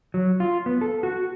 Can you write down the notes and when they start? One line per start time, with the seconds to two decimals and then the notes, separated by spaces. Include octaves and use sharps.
0.14 F#3
0.40 F4
0.66 B3
0.81 A4
1.03 F#4